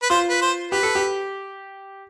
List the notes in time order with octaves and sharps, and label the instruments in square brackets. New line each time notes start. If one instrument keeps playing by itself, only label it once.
[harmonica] B4
[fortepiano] F4 [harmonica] C5
[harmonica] B4
C5
[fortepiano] G4 [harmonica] B4
[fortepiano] A4
G4